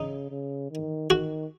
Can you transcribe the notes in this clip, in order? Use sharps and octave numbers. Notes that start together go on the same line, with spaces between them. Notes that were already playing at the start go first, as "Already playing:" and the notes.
Already playing: C#3 D#4
C#3
D#3
D#3 F#4